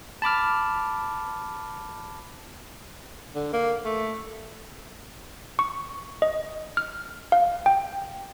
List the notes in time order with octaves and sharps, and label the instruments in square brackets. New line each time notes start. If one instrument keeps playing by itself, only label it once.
[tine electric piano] A5 B5 D6 F6
[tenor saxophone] D3
A#3
A3
[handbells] C#6
D#5
F6
F5
G5